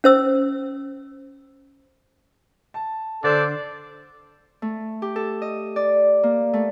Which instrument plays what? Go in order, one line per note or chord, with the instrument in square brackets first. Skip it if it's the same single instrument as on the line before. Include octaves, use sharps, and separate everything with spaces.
[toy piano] C#4 C5 E6
[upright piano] A5
[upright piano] D3 [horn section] D4 C5 [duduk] A4 [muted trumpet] D5
[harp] A3
G4
A4
D#5
D5
A#3
A3